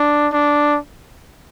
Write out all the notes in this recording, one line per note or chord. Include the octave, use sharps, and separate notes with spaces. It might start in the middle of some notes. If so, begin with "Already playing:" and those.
Already playing: D4
D4